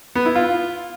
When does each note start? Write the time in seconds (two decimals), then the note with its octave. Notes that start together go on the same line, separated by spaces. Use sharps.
0.15 B3
0.25 E4
0.35 F4